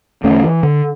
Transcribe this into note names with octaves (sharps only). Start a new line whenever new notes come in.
E2 D3 A3 C#4
E3
D3